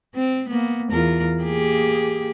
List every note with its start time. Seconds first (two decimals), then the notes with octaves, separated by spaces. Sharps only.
0.15 C4
0.49 A#3 B3
0.91 E2 F4 A#4
1.43 A#3 G4 G#4